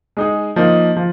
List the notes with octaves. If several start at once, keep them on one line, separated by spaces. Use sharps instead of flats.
G#3 D#4 G#4
F3 A#3 D#4
F3